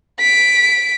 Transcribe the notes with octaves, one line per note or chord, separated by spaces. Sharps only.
B6 D7